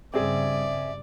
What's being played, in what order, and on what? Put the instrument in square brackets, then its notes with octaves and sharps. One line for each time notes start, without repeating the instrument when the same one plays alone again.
[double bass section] G2 C#3 G3 [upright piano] C4 G#4 [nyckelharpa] D5 [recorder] E5